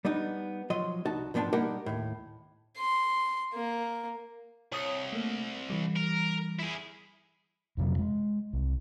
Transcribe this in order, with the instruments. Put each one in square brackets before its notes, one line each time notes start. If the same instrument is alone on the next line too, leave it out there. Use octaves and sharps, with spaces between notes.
[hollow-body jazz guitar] G3 B3 D4 D#4
F3 F#3 D#5 C6
C2 D#4 F#4 A5
G#2 F3 B3 D4 G5 A5
G3 A#3 D#4 G4 A#4 F#5
D#2 A2
[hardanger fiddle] C6
A#3
[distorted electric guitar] C2 [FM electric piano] C#5 D#6 C#7
[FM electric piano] A3 A#3
E3 G3
[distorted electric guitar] A#4
E4 G#4
[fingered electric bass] F2 C3 F#3
G#3
C2